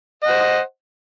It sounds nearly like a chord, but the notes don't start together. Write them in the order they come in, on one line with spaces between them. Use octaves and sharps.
D#5 F#5 C5